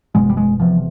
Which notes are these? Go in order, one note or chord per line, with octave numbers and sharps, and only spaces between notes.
F#1 E2 B2 G#3
G3
G#3
E1 E2 C3 F3